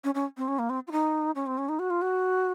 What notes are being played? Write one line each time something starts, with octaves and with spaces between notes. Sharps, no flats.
C#4
C#4
C4
C#4
A#3
C4
F4
D#4
C#4
C4
C#4
D#4
F#4
F4
F#4